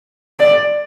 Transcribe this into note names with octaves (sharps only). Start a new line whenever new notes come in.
D5